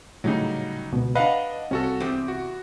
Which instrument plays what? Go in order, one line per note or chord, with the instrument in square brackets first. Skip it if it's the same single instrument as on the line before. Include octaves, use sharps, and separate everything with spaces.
[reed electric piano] A2 C#3 [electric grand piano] F#3 G3 D#4
[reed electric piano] C#2 B2
[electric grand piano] D4 D#5 [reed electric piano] B4 [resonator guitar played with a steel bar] F5 F#5 A#5
[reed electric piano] C2 C3 [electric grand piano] C#4 F#4 A4
[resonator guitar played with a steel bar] E2 G4 [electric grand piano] C4
[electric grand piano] F#4